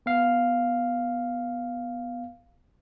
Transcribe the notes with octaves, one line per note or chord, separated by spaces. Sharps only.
B3 F5